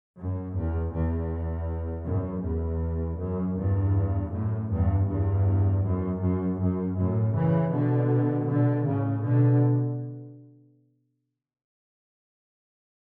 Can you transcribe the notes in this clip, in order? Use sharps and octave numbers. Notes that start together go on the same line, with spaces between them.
F#2
E2
E2
F#2
E2
F#2
E2 G2
F#2 A2
E2 G2
E2 G2
F#2
F#2
F#2
F#2 A2
C#3 E3
B2 D3
B2 D3
A2 C#3
B2 D3